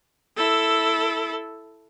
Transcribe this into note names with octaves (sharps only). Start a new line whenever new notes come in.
E4 A4